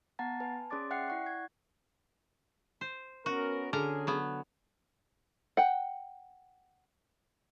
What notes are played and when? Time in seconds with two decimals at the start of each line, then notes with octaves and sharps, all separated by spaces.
0.19 B3 F#5 A5 A#5 A6
0.40 B4 G#5 A5
0.70 C#4 G#4 D5 C6 D6 A6
0.90 E5 F#5 G5 F#6 C7 C#7
1.08 E4 D5 F#5 C#6 F#6
1.26 G#6
2.81 C5
3.26 B3 C#4 F#4 A#4
3.73 D3 C#4 G#4 A#4 A#5
4.07 F#3 B3
5.57 F#5 G5